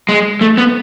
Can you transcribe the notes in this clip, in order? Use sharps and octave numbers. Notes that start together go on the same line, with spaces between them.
G#3
A3
B3